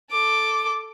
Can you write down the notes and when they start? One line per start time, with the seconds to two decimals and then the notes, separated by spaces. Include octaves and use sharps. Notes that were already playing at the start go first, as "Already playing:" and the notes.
0.11 A4 D6